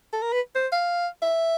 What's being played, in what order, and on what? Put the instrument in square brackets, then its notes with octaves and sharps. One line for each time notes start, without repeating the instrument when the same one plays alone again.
[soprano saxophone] A4
A#4
B4
C5
F5
E5